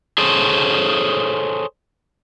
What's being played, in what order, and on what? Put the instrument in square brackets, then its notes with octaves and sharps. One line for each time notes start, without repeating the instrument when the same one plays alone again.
[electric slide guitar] G#4 A4 C5 C#5